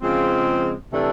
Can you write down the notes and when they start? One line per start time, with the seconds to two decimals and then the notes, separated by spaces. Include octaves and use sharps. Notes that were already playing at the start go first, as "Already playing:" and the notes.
0.02 C#3 F3 G#3 C4
0.92 C3 E3 A3 D4